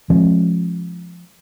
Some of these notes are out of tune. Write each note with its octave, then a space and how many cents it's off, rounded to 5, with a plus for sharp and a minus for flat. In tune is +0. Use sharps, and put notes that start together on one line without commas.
F3 +0 G#3 +25 C#4 -40